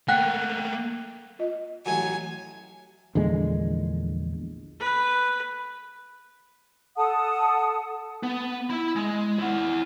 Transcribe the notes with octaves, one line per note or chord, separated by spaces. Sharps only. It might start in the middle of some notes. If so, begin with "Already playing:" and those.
A3 A#3 F#5 G5 F#6
F4 D#5
A1 A2 F#3 G#5
A#1 E2 D3 G#3
B4
A4 F#5 A5 D#6
B3
E4 B5
G#3
E4 F#5